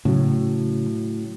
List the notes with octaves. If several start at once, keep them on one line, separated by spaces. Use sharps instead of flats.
A2 C#3 F#3